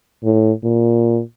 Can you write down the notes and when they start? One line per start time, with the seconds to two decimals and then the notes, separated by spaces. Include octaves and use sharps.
0.24 A2
0.63 A#2